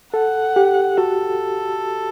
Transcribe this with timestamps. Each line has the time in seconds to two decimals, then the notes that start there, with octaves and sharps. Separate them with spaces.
0.14 A4 F#5
0.56 G4
0.98 F#4 A4